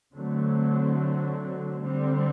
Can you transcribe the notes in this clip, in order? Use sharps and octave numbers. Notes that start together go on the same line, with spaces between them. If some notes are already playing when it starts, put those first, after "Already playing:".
D3 F#3 A3 C4
D3 G3 C4